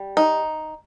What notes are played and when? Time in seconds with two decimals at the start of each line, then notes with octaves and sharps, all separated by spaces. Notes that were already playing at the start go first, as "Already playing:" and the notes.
Already playing: G3
0.17 D#4